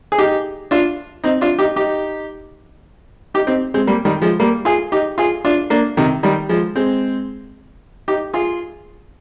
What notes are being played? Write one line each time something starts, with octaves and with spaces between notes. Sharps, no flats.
G#4
D#4 G4
D4 F4
C4 D#4
D4 F4
D#4 G4
D#4 G4
D#4 G4
C4 D#4
G#3 C4
G3 A#3
D#3 G3
F3 G#3
G3 A#3
F4 G#4
D#4 G4
F4 G#4
D4 F4
A#3 D4
C3 D#3
D#3 G3
F3 G#3
G#3 C4
D#4 G4
F4 G#4